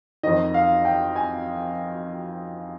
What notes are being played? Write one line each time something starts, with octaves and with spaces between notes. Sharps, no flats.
F2 D#3 D#5
F5
G5
G#5